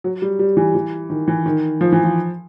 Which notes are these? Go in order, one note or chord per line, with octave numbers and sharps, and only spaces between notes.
F#3
G3
G3
E3
E3
D#3
E3
D#3
F3
E3
F3